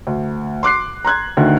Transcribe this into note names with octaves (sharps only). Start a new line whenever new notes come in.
D2
C6 D6 F#6 C7
A#5 C6 F#6 G#6
D2 D3 D#3